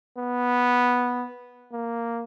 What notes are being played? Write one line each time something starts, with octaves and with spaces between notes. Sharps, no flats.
B3
A#3